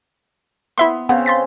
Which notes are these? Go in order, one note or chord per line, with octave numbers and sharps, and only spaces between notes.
B3 E4 E5 C6
C#3 B3 C4 F5
C6 A6 B6